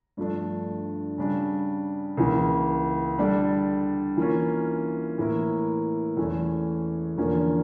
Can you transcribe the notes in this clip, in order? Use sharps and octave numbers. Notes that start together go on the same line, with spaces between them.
G2 F3 A3 D4
C#3 G3 D4
C#2 C#3 E3 A#3
D3 G3 D4 A4 D5
E3 A#3 C#4 F4
A2 E3 A#3 E4 A#4
E2 E3 A3 C#4
E2 D3 F3 A#3 C#4